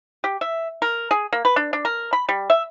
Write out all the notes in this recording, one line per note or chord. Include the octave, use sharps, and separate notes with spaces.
G4
E5
A#4
G#4
A#3
B4
D4
D4
A#4
B5
G3
E5